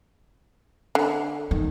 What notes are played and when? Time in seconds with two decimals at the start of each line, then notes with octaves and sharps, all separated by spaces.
0.95 D3
1.51 D#3